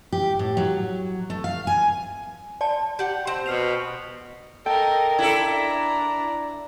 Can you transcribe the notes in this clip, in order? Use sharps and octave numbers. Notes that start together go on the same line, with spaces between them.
G4
A2
F#3
A3
F5
G#5
D5 A5
G4 F#5
C4 E7
B2 F6 C7 F7
A4 A#4 D#5 G5
D4 E4 A4 A#5